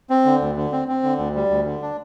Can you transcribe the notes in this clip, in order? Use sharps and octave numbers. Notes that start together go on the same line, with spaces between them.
C4
D3
D2
D3
C4
C4
D3
D2
G3
D2
D3
D4